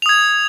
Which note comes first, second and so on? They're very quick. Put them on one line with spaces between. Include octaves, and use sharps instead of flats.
F7 D#6 G#6